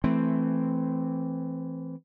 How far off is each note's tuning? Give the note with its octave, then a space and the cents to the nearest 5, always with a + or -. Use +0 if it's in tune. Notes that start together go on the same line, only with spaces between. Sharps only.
E3 +10 A3 +0 C4 +0